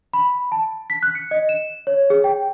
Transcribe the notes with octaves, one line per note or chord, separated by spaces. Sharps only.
B5
A5
B6
F#6
C#7
D#5
E7
C#5
G#4
G5